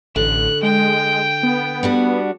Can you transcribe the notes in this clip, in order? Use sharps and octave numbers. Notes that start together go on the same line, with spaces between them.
A1 D3 F#6
G#3 G5
B3
G3 D4 F#4